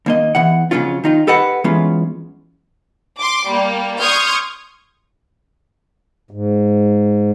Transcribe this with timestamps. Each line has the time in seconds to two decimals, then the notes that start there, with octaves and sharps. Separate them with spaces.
0.06 D#2 A#3 D#5
0.35 E2 E3 F#5
0.71 F2 C#3 F#3 C#4 F4
1.04 D#3 D#4 F4
1.27 G4 A4 B4 D#5 F#5
1.64 E3 F#3 G#3 B3 C#4 F4
3.19 C6 D6
3.49 G3 A#3
4.01 C6 C#6 D#6 F6 G6 G#6
6.31 G#2